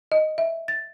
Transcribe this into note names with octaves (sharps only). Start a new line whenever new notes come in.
D#5
E5
A6